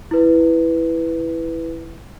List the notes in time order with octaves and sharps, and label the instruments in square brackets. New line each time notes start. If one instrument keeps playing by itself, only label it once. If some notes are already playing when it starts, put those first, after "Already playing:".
[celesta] E4 B4